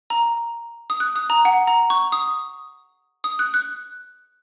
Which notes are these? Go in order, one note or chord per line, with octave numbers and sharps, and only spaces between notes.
A#5
D#6
F#6
D#6
A#5
F#5
A#5
C#6
D#6
D#6
F#6
F#6